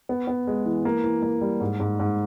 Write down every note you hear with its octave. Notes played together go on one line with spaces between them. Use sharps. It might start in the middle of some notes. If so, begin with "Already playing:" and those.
B3
B3
G#3
E3
A#3
E3
A#3
G3
G#2
G#2
G#2